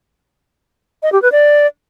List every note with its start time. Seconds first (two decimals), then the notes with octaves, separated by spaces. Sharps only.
1.03 D#5
1.12 G4
1.22 B4
1.32 D5